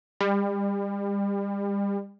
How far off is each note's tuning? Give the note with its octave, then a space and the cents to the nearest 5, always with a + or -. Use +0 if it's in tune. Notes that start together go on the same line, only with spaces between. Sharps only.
G3 +35